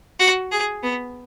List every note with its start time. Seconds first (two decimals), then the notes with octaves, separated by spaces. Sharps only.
0.19 F#4
0.52 G#4
0.83 B3